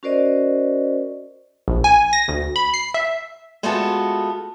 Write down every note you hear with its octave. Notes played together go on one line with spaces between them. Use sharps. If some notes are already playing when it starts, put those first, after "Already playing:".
C#4 F#4 A#4 C5 D5 D#5
A#1
G#5
A#6
D2
B5
C7
E5
G#3 A3 B3 F4 F#4 A4